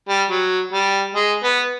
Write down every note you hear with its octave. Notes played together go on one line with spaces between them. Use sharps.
G3
F#3
G3
G#3
B3